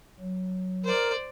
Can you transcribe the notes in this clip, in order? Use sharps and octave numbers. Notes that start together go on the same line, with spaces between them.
F#3
A#4 C5 D5